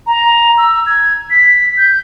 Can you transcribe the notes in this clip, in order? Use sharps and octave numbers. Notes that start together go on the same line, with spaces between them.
A#5
E6
G#6
B6
G6